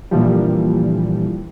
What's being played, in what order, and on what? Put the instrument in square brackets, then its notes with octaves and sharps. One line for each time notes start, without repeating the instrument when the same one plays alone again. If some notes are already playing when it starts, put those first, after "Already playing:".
[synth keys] A#2 D3 E3 F3 G3